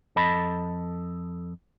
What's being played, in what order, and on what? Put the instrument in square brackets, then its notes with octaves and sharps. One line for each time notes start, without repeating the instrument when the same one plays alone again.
[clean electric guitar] F2 A4 D#5 A5 B5